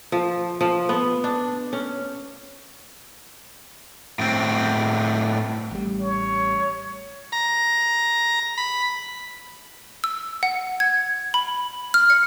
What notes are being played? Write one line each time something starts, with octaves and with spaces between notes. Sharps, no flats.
F3
F3
B3
D4
C#4
A2 C4
A1 G3
C#5
A#5
B5
E6
F#5
G#6
B5
F6
C#7